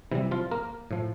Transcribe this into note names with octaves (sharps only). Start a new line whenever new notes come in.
C3 E3 G3 E4
F3 F4
A#3 A#4
A2 F3